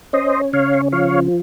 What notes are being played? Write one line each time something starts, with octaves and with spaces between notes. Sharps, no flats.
C#4 C5 D#5
C#3 C#5 F5
F3 C#5 F5